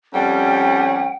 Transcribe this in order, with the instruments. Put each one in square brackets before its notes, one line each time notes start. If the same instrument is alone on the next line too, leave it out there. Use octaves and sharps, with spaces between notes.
[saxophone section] F2 G3 [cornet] C#4 [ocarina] F#5 [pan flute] G5